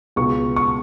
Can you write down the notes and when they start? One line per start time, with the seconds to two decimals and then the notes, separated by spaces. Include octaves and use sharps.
0.16 C#2 B2 G#3 B3 C#6
0.56 C#6